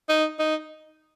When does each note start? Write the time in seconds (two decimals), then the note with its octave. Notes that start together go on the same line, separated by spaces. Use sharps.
0.09 D#4
0.39 D#4